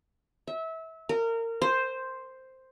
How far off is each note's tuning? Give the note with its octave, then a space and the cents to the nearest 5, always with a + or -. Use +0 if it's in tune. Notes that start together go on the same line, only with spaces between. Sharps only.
E5 -25
A#4 -25
C5 +0